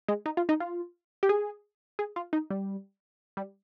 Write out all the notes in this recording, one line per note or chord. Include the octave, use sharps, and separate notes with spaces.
G#3
D#4
F4
D#4
F4
G4
G#4
G#4
F4
D#4
G3
G3